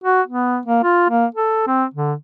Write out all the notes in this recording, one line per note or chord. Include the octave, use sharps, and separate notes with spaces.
F#4
B3
A#3
F4
A#3
A4
C4
D3